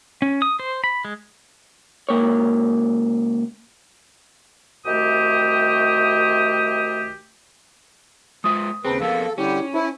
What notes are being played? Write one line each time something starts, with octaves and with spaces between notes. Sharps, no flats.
C#4
D#6
C5
B5
G#3
C#2 A#3 C#5
C2 D#3 A3 F#4 G4 D#6
G#3 F4 E5 D#6
D#2 C#3 C4 G#4 B4 G5 A5
F2 A#3 B3 A4 F5
D3 G3 C#4 E4 G4
D#4 E4 C5 E5